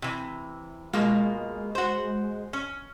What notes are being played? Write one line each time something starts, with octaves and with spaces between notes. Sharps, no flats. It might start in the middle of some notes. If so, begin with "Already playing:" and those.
C3 E3
B2 G#3 A#3 F4
F#4 C5
C#4